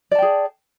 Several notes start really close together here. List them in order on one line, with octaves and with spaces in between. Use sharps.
D5 A5 G5 G#4